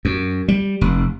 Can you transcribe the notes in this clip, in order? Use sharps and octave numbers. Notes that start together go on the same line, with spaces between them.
F#2
G3
F1